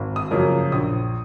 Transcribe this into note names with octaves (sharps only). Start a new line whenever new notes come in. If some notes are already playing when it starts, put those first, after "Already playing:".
Already playing: G#1
D#6
F#2 C#3 F3 A#3
A#1 D#6